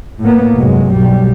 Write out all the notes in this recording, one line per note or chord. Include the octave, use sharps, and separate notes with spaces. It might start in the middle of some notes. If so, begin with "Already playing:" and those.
A2 A#3 B3
F1 G2 F#3 G#3
B1 G3